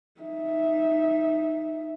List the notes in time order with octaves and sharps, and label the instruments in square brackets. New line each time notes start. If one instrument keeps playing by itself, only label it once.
[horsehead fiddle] D#4 E5